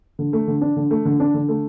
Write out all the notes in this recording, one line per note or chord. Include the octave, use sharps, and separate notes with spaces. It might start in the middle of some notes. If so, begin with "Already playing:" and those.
D3
A3
D3
D4
D3
A3
D3
D4
D3
A3